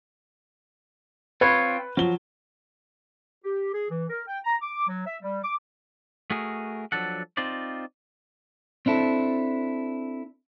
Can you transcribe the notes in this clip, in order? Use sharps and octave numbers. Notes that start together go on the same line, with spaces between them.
C4 F4 B4 C#5
F3 F#3 G7
G4
G#4
E3
A#4
G5
A#5
D6
F#3
E5
G3
D6
A3 F#4 G#4 A#4
F3 F#3 D4 A4 F#5
C4 D#4 F4 C5 D5
C4 D4 E4 A4